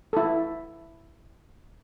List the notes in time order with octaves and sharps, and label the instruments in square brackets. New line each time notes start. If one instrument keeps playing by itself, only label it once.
[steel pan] E4 A4